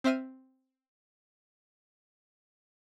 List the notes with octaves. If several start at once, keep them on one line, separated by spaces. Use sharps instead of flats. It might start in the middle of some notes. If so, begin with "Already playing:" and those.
C4 C5 E5 F6 D#7